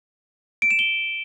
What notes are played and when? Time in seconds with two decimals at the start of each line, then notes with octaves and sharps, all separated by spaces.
0.62 D7
0.71 E7
0.79 G7